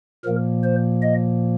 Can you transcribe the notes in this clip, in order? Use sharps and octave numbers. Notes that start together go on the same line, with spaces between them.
A#2 F3 A#3 A#4
C5
D#5